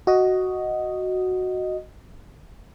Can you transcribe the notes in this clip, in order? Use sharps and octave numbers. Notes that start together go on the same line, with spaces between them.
F#4 D#5